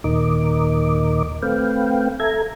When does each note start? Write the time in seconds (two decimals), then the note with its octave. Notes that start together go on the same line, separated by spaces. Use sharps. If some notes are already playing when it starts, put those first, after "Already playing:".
0.04 D#2 A#2 D#3 A#4 D#5 D6
1.42 A3 C4 B4 F5 G5
2.20 A4 E5 A#5 G#6